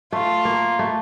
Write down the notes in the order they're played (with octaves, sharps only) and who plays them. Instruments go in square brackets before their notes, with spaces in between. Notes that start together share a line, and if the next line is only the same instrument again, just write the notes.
[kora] A3 [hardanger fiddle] F4
[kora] A#3
A3